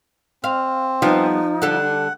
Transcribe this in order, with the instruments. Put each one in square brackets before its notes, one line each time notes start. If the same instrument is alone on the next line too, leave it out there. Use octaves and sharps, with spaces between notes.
[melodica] C4 [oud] F5
[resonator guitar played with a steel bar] F3 [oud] G3 B3 [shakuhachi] D#4
[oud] D3 G3 A4 [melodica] F#5